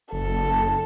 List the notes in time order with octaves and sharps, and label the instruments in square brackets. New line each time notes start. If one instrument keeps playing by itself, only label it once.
[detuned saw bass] F#1 [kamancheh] A4